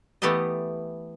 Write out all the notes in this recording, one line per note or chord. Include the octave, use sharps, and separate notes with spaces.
E3 A3 B3 G4 A4 D#5